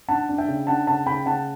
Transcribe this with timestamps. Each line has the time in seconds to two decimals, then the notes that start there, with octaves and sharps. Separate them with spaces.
0.08 D4 F#5 A5
0.29 D4
0.38 E5 G5
0.48 C#3
0.67 D4 F#5 A5
0.87 C#3 F#5 A5
1.06 C#3 G5 B5
1.26 C#3 F#5 A5